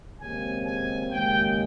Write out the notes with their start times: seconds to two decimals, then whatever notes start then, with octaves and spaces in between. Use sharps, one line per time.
0.20 D#2 C#3 G#3 C4 G#5
0.66 G#5
1.12 D#2 C#3 G#3 G5